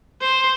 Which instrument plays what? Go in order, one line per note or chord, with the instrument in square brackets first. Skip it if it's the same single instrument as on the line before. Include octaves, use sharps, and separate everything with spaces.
[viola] C5